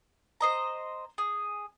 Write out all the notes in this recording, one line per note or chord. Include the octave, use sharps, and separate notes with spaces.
C5 D#5 A#5
G#4